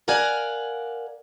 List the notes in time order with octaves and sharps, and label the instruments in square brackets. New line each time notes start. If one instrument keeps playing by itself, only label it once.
[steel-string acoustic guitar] A#4 D5 F5 F#5 G#5